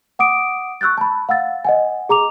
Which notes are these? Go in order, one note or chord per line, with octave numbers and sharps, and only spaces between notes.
F#5 D6 D#6 D7
C#6 E6 F#6 G6 A6
A5 B5
F5 F#5 E6 A6
D#5 F#5 G#5
G#4 A#5 D6 F7